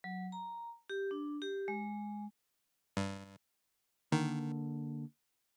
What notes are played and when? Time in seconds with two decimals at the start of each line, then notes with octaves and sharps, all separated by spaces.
0.04 F#3
0.32 A#5
0.89 G4
1.11 D4
1.42 G4
1.68 G#3
2.97 G2
4.12 D3 D#3 A#3